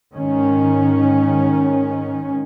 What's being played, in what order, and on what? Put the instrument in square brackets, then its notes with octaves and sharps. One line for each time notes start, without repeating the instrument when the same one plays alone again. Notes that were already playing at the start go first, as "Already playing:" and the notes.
[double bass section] G#2 D#3 C#4